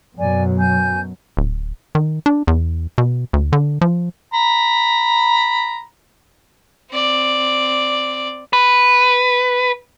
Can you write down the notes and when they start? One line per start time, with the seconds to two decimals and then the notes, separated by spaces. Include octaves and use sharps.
0.18 F#2 B2 F#3 D5 G#5
0.60 G#5 G6
1.37 D1
1.95 D#3
2.26 D4
2.47 E2
2.98 B2
3.33 D2
3.53 D3
3.81 F3
4.34 A#5 B5
6.91 C4 D5
8.53 B4